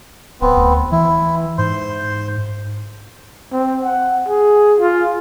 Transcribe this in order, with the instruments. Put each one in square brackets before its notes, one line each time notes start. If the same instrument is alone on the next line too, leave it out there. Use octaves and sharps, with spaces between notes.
[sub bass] D1 [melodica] B3 C4
[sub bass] D2
[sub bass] E3 [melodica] E4
[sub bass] G#2 [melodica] C5 C6
[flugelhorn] C4
F#5
G#4
F4